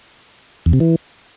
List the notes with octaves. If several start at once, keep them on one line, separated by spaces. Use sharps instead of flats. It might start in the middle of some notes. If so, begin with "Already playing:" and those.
E2
C3
E3